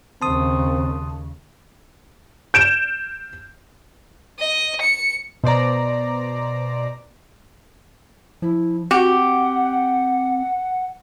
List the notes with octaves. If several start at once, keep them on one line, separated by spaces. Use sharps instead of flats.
D#2 C#3 C4 A5 C6 D#6
G6 D7 E7
D#5
C#7
B2 C5 D5 A#5
F3 E4
C4 F#4 G4 F#5